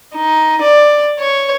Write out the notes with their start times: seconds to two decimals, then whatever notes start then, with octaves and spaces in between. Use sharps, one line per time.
0.16 D#4
0.62 D5
1.20 C#5